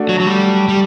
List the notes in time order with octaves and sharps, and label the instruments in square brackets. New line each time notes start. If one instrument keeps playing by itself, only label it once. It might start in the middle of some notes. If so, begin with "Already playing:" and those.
Already playing: [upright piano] A3 D4 F#4
[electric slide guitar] F#3
F#3
G3
G3